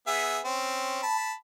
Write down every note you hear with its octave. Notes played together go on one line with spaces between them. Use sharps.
B3 G#4 E5
C4 C#4
A5 B5